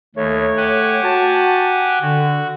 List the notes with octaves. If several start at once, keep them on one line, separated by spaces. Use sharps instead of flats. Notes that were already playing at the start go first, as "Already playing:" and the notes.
D#2 A3 C#5
G4 F#5 G#5
F#4 A5
D3 F#4